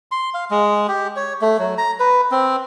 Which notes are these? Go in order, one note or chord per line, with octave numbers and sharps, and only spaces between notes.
C6
F5
G#3
G4
C#5
A3
F#3
A#5
B4
C4